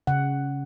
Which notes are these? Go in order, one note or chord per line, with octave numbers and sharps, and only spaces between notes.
C#3 F#5